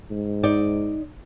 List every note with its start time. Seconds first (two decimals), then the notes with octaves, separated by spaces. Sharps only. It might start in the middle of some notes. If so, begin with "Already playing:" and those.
0.11 G#2
0.43 D#4 D5